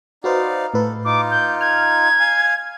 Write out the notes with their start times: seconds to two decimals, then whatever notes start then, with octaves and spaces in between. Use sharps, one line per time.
0.24 D#4 F#4 B4 C5 D5 F5
0.74 A2 A4 B4
1.05 D#4 F4 D6
1.31 G6
1.61 F6 G#6
2.20 F5 G#5